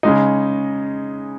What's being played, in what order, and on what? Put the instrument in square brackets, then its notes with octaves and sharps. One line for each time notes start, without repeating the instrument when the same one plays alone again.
[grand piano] C#3 G#3 D#4